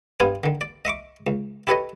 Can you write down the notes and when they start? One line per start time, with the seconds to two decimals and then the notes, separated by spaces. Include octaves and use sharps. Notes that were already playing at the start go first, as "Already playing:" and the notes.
0.20 G2 B3 C5 F5 G#5
0.44 D3 D#3
0.61 D5
0.85 D#5 E5 C#6 D6
1.27 C#2
1.67 E4 G4 A4 B4 C#5 D#5